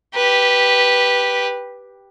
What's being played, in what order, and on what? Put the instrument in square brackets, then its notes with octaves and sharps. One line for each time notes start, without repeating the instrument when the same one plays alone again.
[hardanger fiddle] G4 B4